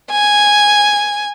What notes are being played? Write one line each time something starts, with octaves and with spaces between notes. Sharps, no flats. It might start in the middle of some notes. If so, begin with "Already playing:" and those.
G#5